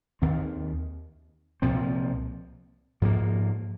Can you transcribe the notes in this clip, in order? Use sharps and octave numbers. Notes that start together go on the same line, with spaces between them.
D#2 D#3 C4
C2 A#2 F3 C4
G#2 F3 A#3